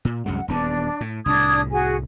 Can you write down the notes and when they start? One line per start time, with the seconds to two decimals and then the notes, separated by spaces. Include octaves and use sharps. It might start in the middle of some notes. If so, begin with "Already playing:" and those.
0.05 A#2
0.26 C2 F#2 G#3 F#5
0.48 D#1 E2 B3 D4
1.01 A2
1.26 C2 A2 D4 D#6 G#6
1.71 F#4 G#4 G#5